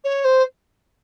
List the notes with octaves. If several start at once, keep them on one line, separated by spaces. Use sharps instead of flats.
C#5
C5